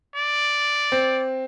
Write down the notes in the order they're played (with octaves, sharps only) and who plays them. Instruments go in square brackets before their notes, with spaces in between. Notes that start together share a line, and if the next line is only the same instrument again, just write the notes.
[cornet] D5
[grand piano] C4